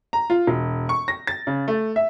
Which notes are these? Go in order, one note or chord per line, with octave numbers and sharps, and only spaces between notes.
A#5
F4
E1
C#6
A#6
A6
C#3
A3
E5